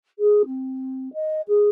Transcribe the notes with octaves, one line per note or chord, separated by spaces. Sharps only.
G#4
C4
D#5
G#4